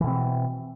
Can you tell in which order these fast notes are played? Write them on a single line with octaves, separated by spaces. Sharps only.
E3 B2 C4